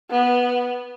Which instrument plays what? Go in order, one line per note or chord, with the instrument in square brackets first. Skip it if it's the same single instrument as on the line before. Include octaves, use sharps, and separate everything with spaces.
[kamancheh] B3